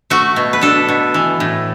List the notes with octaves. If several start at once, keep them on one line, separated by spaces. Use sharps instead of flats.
A3 F#4
B2
B4
D4 A4
B2
E3
A2